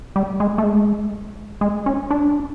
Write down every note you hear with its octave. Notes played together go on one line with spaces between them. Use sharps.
G3
G#3
A3
G#3
G#3
C#4
D4